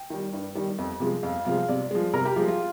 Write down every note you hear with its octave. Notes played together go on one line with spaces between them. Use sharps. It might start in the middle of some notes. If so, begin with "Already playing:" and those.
Already playing: G5
D#3 G3
G2
D#3 G3
F2
C3 F3 G#3
F2 F5
C3 F3 G#3 F5
C3 D5
F3 G#3
C3 A#4
G4
F3 G#3 G4
F4